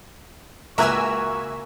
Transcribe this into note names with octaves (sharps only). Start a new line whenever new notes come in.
C#2 A#3 F#4 E5 G#5 A#5 E6 F#6